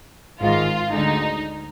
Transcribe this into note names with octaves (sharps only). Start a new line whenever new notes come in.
G#1 G#2 D#3 F4
D2 D3 G#3 D#4